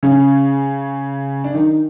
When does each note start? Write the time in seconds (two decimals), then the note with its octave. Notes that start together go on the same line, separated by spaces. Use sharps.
0.03 C#3 C#4
1.44 D4
1.54 D#3 D#4